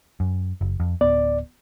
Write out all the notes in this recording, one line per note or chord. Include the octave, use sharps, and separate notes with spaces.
F#2
F#1
F2
D1 B3 D5